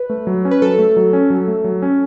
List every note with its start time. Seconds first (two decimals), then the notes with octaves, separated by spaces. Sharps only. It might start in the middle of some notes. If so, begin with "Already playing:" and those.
Already playing: B4
0.10 A3
0.27 F#3
0.45 C#4
0.51 B4
0.62 F#3 A4
0.79 A3
0.96 F#3
1.13 C#4
1.30 F#3
1.48 A3
1.64 F#3
1.82 C#4